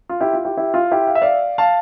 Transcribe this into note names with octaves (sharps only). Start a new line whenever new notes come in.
F4
E4 G4
F4
E4 G4
E4 G4
F4
E4 G4
F5
E5
D5 F5
F5 A5